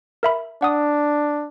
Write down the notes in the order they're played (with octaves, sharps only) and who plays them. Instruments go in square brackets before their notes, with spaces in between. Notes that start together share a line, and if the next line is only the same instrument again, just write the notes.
[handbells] A#4 E5 B5
[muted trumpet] D4 [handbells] F#5 D#6